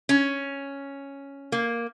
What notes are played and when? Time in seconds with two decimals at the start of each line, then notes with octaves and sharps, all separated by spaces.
0.09 C#4
1.52 A#3